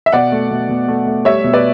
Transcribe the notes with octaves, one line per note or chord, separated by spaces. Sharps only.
E5
B2 D5 F#5
A3
B2
B2
A3
A3
G3 C#5 E5
B2
B4 D5